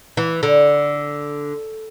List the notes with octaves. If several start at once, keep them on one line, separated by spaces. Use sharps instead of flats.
E3
D3